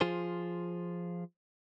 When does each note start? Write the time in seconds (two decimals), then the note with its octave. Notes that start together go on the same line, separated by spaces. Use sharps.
0.01 F3 F4 G#4 C5